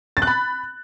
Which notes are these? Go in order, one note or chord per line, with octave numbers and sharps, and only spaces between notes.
A6
F#6
B5